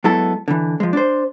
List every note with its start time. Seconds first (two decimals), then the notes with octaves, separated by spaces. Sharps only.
0.04 F#3 G#3 B3 E4 A4
0.48 D3 E3
0.80 F3 G#3
0.93 D4 C5